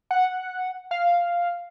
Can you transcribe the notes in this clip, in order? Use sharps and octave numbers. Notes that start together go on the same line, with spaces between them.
F#5
F5